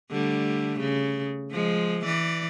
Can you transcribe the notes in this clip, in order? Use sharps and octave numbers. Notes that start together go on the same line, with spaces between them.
D3 G3 A3
C#3
F3 G#3
E3 D5